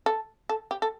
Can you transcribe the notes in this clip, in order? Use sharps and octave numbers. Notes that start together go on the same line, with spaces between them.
A4
A4
G4
A4